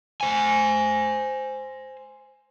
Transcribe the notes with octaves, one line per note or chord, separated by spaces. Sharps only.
C5 G#5